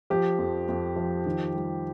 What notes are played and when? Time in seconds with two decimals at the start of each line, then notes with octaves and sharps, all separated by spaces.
0.10 F3 G4
0.39 F2
0.68 F2
0.96 F3
1.26 D#3
1.55 G3